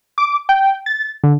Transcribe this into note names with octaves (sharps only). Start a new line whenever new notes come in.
D6
G5
A6
D3